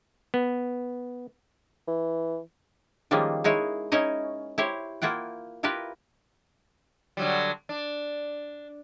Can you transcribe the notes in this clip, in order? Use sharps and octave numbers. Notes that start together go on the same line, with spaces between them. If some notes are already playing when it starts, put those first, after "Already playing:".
B3
E3
D#3 F3 G3 G#3 A#3 C#4
G#3 D#4 E4 C#5
C#4 D#4 E4 C#5 D#5
E4 G4 C5 C#5
A#3 E4 F4 F#5 G5
E4 F4 G4 A#4 B4
D3 F#3 G3
D4